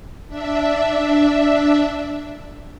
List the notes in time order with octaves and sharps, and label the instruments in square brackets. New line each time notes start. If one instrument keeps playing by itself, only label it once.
[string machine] D4 E5